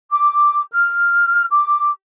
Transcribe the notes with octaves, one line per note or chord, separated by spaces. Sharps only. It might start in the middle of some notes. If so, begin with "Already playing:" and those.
D6
F6
D6